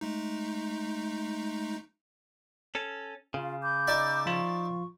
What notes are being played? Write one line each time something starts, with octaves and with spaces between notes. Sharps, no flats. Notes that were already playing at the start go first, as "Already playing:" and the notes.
G#3 A3 D#4
C#4 A4
C#3 F4
B5 D6 G6
D#4 D5 E5
F3 F4 C#6